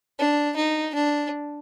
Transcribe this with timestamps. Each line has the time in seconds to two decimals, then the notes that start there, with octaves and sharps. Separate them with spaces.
0.19 D4
0.57 D#4
0.95 D4